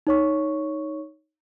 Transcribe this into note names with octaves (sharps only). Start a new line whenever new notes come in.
D#4 C#5 C#6